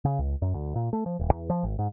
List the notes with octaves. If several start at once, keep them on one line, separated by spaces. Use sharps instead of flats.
C#3
C#2
F#2
D2
A#2
A3
F3
D#1
E2
F3
G#1
G#2